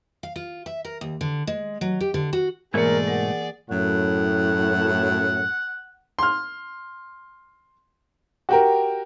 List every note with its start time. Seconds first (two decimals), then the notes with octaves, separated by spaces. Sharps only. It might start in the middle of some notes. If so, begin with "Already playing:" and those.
0.23 F5
0.36 F4
0.66 E5
0.85 A#4
1.01 D#2
1.21 D3
1.47 G#3
1.81 F#3
2.01 G4
2.14 D3
2.33 F#4
2.74 G#2 B2 E3 A3 A#3 G#4 A#4 D5
3.08 A#4 F#5
3.71 F#2 A2 F#5
6.19 C6 F6
8.49 F#4 G4 A#4